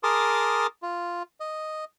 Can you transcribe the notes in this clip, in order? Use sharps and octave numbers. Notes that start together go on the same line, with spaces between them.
G#4 A#4 A5 C6 D6 D#6
F4
D#5